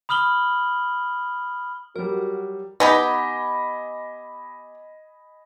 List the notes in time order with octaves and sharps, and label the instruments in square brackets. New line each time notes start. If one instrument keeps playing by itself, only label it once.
[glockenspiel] B5 D#6 F6 F#7 G7
[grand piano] F#3 G3 [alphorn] F#4 [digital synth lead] A#4
[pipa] B3 D#4 G4 [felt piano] D#5 G#5 B5